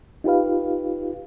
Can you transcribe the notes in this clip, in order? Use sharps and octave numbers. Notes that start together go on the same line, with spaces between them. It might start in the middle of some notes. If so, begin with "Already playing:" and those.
D#4 F4 G4 B4 F5